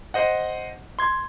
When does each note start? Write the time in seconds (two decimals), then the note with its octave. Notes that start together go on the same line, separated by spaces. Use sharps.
0.14 C5 D#5 F#5
0.99 C6 G#6